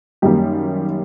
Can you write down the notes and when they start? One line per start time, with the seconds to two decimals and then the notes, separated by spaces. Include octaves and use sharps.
0.22 F#2 D#3 G3 A#3 G4